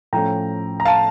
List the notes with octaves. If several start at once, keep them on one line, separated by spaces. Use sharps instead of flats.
A2 F3 A3 C#4 G5 A#5
A#5
F5 A5